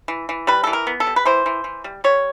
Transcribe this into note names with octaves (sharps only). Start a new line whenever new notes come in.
E3
E3
G3 B4
E3 A4
A#4
B3
A4
G3
B4
E3 C5
E3
E3
G3
G3 C#5